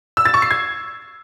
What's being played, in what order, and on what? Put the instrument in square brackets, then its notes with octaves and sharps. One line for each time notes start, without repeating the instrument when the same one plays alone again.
[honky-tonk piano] E6
A6
C#6
C7
G#6